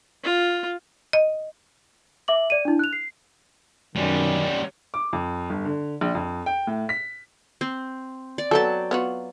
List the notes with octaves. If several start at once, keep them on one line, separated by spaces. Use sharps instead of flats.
F4
D#5
E5 D6 F#7
D5 D#7
D4 E4
F#6 F7
C7
F#2 B2 D#3 G3 C#4
D6
F2
G1
D3
A#1
F2
G5
A2
B6
C4
D5
F#3 B3 A4 G5 A5
B3 F4 F#4